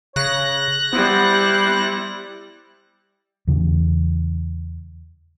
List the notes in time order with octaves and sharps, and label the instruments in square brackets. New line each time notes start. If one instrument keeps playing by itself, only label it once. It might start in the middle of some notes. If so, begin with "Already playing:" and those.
[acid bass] C#3 [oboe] C#5 [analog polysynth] F#6 A#6
[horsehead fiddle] G3 E4 [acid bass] B3 [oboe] C5
[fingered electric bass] E2 C#3 E3